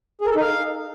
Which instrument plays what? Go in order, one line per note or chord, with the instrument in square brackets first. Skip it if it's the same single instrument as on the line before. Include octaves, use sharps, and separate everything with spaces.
[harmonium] G#4
A#4
A4
D#4
F5